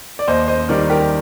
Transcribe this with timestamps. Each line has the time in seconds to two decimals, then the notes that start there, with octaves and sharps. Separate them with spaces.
0.19 D5
0.28 D#2 C5 D#5
0.48 C5 D#5
0.68 D#3 G3 A#4 D5
0.90 G4 A#4